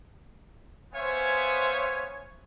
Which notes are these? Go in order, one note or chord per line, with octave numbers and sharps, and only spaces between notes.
B3 C5 C#5 E5 F5 G#5